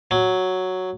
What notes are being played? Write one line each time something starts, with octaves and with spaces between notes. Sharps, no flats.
F#3